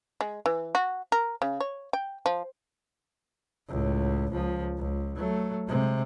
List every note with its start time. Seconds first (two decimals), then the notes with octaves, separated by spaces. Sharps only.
0.21 G#3
0.46 E3
0.75 F#4
1.12 A#4
1.42 C#3
1.60 C#5
1.93 G5
2.26 F3
3.69 C#2 A2
4.32 C#2 F3
4.78 C#2
5.15 F#3 A3
5.68 C3 G#3